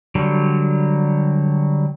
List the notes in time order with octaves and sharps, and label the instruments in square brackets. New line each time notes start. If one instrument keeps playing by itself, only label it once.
[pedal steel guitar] D3 F#3 G3